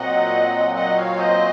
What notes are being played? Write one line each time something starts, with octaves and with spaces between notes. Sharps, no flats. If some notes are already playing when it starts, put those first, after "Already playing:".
Already playing: A#2 F#3 C4 D#5 F#5
D#5 F#5
C#5 F5
C5 D#5